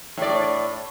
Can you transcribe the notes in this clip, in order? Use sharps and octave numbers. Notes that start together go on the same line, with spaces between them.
A2 D5